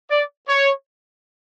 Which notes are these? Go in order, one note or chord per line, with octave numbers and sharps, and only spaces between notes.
D5
C#5